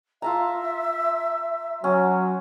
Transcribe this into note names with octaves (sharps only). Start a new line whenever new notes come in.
F4 E5 A5 A#5
F#3 C#4